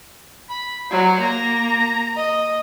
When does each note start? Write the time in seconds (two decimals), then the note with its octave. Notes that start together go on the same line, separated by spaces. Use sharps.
0.49 B5
0.91 F#3 C5
1.20 A#3 A#5
2.16 D#5